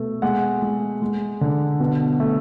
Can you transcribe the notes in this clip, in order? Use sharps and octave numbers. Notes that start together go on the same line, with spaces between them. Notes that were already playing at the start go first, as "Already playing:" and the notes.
Already playing: B2 A3
G#3 F#5
G#3
G#3
D3
B2
A3